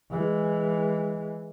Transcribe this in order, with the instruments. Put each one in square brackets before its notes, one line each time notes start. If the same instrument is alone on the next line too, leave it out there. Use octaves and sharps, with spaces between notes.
[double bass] E3 G#3